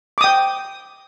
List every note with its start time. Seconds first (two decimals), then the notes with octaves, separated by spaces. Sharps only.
0.18 D6
0.21 D#6
0.24 G5